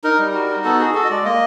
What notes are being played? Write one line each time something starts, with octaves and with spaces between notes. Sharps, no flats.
D#4 A#4
G3
F#4
D#4
B3 A4
F#4 G#4
F#4 A4
D#5
G#3 D5
A#3 D#5